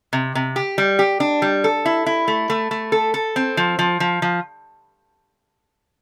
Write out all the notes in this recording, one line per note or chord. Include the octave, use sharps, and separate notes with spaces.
C3
C3
G4
G3
G4
D4
G3
A4
E4
E4
A3
A3
A3
A4
A4
C4
F3
F3
F3
F3